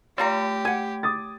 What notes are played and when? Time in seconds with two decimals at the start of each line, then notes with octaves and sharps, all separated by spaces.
0.18 G3 A3 F4 G4 A#5
0.65 F#5 G#5 G#6
1.03 D6 D#6 A6